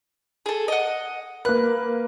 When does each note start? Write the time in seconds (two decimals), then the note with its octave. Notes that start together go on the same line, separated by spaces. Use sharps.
0.46 G#4 A4
0.68 D#5 F#5
1.45 A#3 B4 F#6